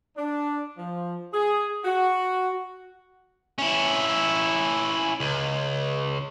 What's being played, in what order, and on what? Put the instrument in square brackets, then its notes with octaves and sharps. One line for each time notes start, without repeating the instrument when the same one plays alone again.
[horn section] D4
F3
G#4
F#4
[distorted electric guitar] C#4 E4
C#2